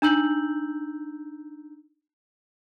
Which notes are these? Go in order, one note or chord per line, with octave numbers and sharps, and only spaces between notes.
D4 D#4 A#5 E6 G6 F#7